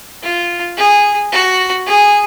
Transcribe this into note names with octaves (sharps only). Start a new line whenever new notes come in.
F4
G#4
F#4
G#4